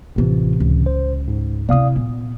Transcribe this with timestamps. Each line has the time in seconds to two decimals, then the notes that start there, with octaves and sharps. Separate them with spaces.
0.16 A1 A2 C3 E3 F4
0.60 C#2
0.86 C5
1.28 G#2
1.69 C3 E4 D5 F5 D#6
1.96 A#2 B3